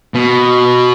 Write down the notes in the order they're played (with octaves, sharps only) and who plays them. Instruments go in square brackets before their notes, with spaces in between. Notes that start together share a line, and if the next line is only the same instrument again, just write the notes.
[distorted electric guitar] B2